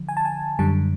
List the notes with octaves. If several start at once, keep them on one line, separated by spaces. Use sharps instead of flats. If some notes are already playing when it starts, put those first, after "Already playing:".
Already playing: D3 F3
G#5
A5
G#5
F#2 D3 G3 A5